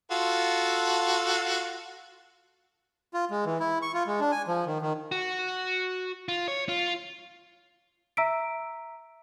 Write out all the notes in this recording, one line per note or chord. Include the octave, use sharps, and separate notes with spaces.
F4 F#4 A4
F4
G#3
E3
E4
C#6
F4
G#3
D4
G#5
F3
D#3
D#3
F#4
F4
C#5
F4
E5 A#5 E6 B6 D7